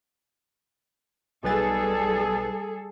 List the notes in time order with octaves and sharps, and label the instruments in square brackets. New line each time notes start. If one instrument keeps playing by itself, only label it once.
[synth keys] B1 B4 A6 [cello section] G3 G#4 A4